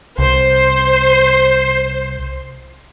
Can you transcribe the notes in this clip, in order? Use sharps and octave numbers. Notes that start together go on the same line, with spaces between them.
C2 C5